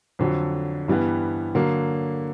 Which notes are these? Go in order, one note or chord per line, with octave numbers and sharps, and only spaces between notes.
F2 D3 F#3
G2 E3 G3 B3
D3 F#3 A#3